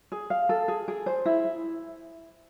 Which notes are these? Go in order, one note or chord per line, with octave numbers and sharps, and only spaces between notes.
G#4
F5
A4
G#4
G#4
C5
E4